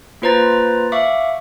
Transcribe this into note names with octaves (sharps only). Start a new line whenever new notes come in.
A#3 F4 B4 C5 A#5 A6
E5 F5 C#6 D6